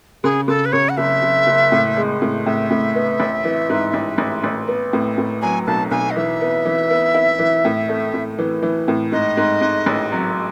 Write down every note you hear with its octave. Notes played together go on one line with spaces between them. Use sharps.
C#3 G#4
C#3 A4
B4
C#3 C#5
F#5
F#1 E5
F#1
F#1
A2
G#3
A2
A2 E5
A2
B3
A1
E3
G#2
A1
A1
A1
B3
A2
A2
F#3 G#5
B1 A5
B1 G#5
D#5
E3 E5
B3
E3
B3
E4
E3
A2
A3
A2
E3
E3
A2
G#2 D#5
G#2
G#2
A1
F#3